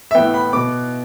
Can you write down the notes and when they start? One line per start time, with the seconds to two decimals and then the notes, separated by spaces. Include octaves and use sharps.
0.11 E5
0.15 A2 E3 B3 G5
0.34 B5
0.53 B2 B3 D6